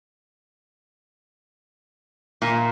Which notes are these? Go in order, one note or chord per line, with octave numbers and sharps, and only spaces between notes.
A#2